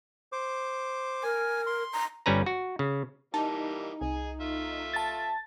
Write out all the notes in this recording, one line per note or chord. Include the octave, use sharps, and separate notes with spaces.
C5 D6
A#4 G#5
C6
A#5
G1 G3 C#4 B4 A#5
F#4
C#3
E3 G3 A#3 D#4 A5
C2 G#4 G#5
A3 F4 E5
A5 A6